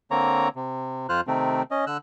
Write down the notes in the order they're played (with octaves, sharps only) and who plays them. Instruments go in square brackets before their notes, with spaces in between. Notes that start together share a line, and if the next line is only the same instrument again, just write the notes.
[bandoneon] D3 A#3 C4 C#5 A#5
C3
F2 F4 C5 F6 F#6
C3 D#3 A3 C4
C#4 D#5
D3 E6 F#6